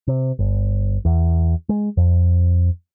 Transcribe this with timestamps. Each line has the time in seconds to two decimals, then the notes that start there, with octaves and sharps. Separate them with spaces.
0.08 C3
0.39 G1
1.05 E2
1.69 G#3
1.97 F2